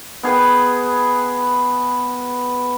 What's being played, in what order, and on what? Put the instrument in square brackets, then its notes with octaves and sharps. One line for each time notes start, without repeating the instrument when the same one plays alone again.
[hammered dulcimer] B3 G#4 B4 G5